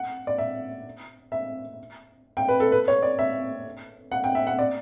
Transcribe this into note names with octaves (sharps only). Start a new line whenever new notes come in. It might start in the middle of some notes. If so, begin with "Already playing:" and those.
Already playing: F#5
D5
E5
E5
G5
B4
A4
B4
C#5
D5
E5
F#5
G5
E5
F#5
D5